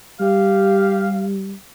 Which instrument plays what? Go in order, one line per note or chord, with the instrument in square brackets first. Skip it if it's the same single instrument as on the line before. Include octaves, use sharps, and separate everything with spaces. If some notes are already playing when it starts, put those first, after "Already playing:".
[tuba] G3 [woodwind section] G4 F5